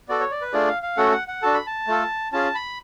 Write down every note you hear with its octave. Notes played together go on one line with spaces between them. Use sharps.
B3 F#4 A4 D5
C#5
D5
B4
A3 D4 F4 G#4 D5
F5
F5
A3 C#4 F#4 A4 F#5
F#5
F#5
D4 F#4 A4 A5
B5
A5
A3 F4 A4
C#4 F4 G#4 A5
B5